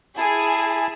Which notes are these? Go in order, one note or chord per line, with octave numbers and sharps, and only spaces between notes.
E4 G#4 A5